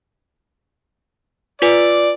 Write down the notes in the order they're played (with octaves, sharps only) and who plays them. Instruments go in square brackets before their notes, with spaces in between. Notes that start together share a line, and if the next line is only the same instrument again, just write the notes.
[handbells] F4 B4 G#5 [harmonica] D5